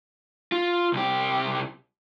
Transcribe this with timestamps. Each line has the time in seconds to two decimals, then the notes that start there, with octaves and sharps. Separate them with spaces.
0.52 F4
0.93 C2 G4